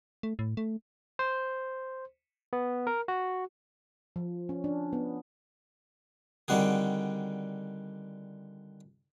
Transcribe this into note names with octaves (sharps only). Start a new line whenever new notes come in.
A3
A2
A3
C5
B3
A#4
F#4
F3
C#4
D4
B3
D3 D#3 G3 C4 F#4 G#4